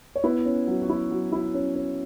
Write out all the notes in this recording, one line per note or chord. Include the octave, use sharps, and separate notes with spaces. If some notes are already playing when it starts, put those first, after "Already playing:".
C#5
B3 E4 B4
C#4
F#3
F#4
E4
F#3
E4
C#4
C#4